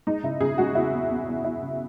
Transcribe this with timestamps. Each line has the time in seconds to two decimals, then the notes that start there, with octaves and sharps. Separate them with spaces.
0.07 G#3 D#4
0.23 C#3 E4
0.40 C#3 G#4
0.58 G#3 F#4
0.75 E2 E4
0.93 E2
1.10 E2
1.28 E2
1.44 E2 E4
1.62 C#3